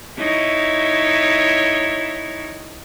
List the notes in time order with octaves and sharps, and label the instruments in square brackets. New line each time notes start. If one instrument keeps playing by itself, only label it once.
[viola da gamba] D#4 E4 C#5